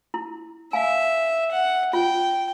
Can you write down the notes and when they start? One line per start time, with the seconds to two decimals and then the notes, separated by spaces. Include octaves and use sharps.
0.14 E4
0.73 E5 F5 G#5
1.51 F#5
1.93 F4 G5